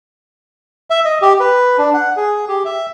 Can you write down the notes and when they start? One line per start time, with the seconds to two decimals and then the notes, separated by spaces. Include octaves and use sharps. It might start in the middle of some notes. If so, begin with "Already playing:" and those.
0.90 E5
1.05 D#5
1.22 G4
1.40 B4
1.78 D4
1.94 F#5
2.17 G#4
2.48 G4
2.65 E5